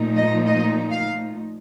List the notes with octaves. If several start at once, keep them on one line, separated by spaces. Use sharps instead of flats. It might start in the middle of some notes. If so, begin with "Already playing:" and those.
Already playing: A#2 F3 A3 D#4
D#5
D#5
F5